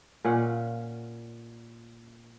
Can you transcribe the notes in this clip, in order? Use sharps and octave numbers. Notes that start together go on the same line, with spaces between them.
A#2 C#4 F5 F#5